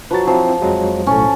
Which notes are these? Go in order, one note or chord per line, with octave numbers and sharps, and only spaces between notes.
F3 F#3 B4 A6
F3 C4 E4 F4
F2 F#3 G#3
B1 A2 C#4 A4